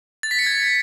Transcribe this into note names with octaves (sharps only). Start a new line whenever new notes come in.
A6
B6
C#7
G#6